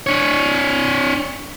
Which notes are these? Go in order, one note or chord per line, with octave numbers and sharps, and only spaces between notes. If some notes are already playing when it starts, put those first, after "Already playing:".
D4 C#5